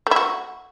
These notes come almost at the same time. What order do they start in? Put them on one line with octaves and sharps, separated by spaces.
A3 E4 F#4